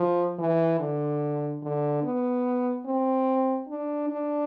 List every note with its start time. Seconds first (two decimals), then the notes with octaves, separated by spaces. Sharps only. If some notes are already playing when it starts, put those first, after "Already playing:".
Already playing: F3
0.39 E3
0.80 D3
1.62 D3
2.04 B3
2.86 C4
3.69 D4
4.10 D4